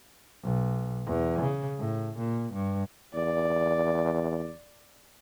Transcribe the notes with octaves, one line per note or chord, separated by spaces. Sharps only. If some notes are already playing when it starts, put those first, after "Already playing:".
B1
E2
C#3
A2
A#2
G2
E2 D5